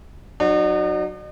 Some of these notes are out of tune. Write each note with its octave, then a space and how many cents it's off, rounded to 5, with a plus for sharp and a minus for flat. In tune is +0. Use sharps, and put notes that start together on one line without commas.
F#3 +0 D#4 -45 F#4 +0